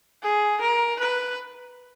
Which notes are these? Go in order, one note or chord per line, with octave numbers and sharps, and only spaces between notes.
G#4
A#4
B4